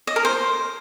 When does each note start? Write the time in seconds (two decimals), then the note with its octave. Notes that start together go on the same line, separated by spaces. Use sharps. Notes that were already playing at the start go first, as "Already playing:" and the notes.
0.07 D#5
0.16 A#4
0.25 C5